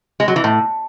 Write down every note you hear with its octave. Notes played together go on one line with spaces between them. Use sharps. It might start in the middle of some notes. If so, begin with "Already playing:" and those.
G#3
F#3
E3
A2